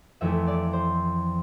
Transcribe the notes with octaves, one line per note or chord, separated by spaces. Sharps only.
F2 E3 A3 E5
D5
C5